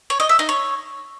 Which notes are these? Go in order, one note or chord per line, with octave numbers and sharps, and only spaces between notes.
C#5
D#5
E5
D#4
C#5